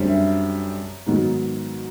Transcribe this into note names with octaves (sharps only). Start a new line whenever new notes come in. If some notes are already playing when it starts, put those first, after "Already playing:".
Already playing: F#2 D3 G3 C4
E5
G#2 D#3 F#3 B3